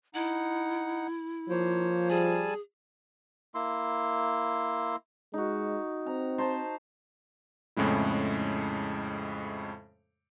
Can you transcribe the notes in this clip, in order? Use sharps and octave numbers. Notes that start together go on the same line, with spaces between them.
D#4 E4 F#5
F3 A#3 C5 C#5
G3 G#4 G#5 A5
A#3 E4 C6
G#3 D#4 F#4
C4 A#5
C5 A5 A#5
F2 A2 C#3 G#3 E4